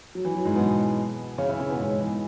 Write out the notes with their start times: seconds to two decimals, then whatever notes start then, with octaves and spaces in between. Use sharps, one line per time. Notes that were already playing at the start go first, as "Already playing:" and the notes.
0.15 F#3
0.25 E3
0.35 F#3
0.45 G#2 G#3
0.55 B2 B3
1.38 C#3 C#4
1.49 E3 E4
1.60 C#3 C#4
1.69 B2 B3
1.79 G#2 G#3
2.00 E3